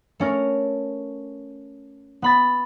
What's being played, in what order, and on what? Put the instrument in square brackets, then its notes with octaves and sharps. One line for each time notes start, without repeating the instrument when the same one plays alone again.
[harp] A3 C#4 A#4
B3 B5 A6